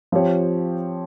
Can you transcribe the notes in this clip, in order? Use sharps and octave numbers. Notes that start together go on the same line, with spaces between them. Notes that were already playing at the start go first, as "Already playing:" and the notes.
F3 C4 G4 C#5